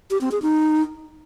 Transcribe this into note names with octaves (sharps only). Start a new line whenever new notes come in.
G4
C4
G#4
D#4